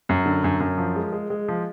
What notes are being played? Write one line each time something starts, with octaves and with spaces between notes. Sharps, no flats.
F#2
D3
F#2
F#2
F3
G#3
G#3
G#3
F3